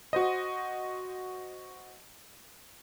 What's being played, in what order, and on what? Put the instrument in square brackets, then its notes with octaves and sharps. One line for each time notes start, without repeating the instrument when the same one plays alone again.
[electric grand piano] F#4 C5 D#5